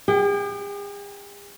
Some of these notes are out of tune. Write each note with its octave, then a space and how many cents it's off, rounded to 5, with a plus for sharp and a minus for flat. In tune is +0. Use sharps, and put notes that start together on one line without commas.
G#4 -45 G5 -20